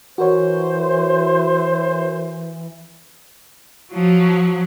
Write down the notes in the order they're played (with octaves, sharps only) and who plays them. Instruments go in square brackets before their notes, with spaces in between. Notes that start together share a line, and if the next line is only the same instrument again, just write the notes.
[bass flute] E3 [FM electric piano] F#4 A#4 C#5 [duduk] C5
[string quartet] F3 F#3